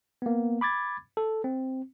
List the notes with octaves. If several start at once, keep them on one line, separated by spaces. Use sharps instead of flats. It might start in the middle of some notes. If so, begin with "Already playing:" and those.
A#3 B3
B5 D6 G#6 A6
A4
C4